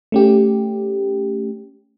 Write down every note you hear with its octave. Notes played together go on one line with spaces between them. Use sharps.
A3 C#4 G4